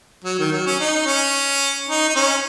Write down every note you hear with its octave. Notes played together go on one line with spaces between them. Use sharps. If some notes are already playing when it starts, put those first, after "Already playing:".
F#3
D#3
F#3
C#4
D#4
C#4
D#4
D#4
C#4